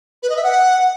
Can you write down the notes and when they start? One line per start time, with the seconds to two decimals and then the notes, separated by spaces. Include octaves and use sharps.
0.23 B4
0.30 D#5
0.37 E5
0.43 F#5